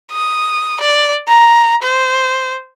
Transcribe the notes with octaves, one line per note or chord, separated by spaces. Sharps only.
D#6
D5
A#5
C5